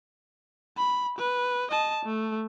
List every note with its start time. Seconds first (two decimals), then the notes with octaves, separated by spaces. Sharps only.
0.77 B5
1.18 B4
1.71 D#5 A5
2.05 A3